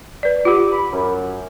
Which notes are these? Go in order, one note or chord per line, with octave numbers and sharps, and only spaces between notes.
B4 D5
F4 G4 F#5 B5 D6
B5
F#2